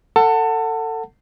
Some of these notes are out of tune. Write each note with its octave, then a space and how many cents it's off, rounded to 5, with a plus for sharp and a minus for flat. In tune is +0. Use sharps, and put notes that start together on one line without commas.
A4 +25 F#5 +0 A5 +25